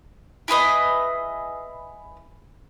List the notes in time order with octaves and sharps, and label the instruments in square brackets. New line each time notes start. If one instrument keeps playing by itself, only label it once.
[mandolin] E4 G#4 B4 D#5